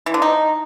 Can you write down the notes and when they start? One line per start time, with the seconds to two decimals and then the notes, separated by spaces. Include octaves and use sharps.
0.06 E3
0.14 D3
0.22 D#4